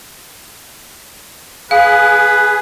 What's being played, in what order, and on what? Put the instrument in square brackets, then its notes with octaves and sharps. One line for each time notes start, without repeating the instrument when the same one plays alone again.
[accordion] G#4 [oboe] B4 [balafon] F5